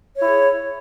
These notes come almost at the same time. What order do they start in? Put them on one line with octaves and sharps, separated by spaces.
C#5 E4 G#4